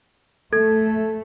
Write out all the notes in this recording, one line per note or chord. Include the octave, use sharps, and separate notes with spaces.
A3 A4 G#6